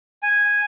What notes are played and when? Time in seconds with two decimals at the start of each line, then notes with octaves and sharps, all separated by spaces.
0.23 G#5